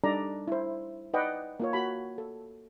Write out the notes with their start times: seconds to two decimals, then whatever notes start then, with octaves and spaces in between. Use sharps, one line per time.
0.04 G3 D4 D#4 A4 D5 A#5
0.48 E4 C5
1.13 D#4 B4 D5 D#5 F#5 G5
1.60 A#3 F4 C#5
1.73 F#4 A5 B5
2.18 A4